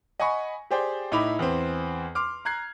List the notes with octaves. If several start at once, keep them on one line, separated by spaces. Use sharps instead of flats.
D#5 F#5 G#5 B5 C#6
G4 G#4 C5 D5 G5
A2 D#4 E4 B5 D6 F7
E2 E3 C4
C6 D6 F6
A#5 F#6 G#6 C7